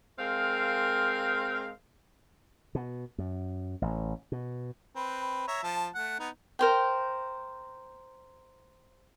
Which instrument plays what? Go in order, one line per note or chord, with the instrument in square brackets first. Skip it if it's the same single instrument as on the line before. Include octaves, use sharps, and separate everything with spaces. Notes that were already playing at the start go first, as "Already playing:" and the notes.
[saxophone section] G#3 C4 A#4 F5
[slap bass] B2
F#2
A1
B2
[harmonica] C4 B4
C#5 E5 A#5
F3 A5
A3 F#5
B3 D#4
[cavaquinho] A#4 C5 G5